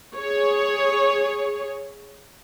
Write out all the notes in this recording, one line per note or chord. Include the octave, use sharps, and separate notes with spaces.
G#4 C#5